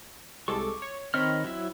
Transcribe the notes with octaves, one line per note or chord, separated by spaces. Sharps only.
C2 G#3 A4 C#6 D6
C#5
D#3 C4 C#5 D#5 B5 F6
F#3 E4